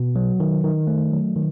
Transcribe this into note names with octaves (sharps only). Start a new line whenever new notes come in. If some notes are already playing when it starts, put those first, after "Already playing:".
Already playing: B2
F#3
D#3
D#3
A3
F#3
D#3